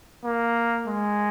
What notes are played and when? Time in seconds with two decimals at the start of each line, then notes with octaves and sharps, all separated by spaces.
0.25 A#3
0.87 G#3